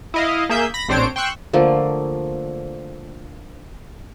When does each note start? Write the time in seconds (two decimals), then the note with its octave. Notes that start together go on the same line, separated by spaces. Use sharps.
0.14 E4 D#5 F5
0.49 A#3 G#4 E5 G6
0.74 B5 A#6
0.88 A#1 C4 D4 C5 C#5 D7
1.16 G5 C6 C#6 E6 F#6
1.53 D3 F3 A3 A#3